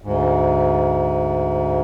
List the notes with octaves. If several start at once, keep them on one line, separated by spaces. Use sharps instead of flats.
D2 G#2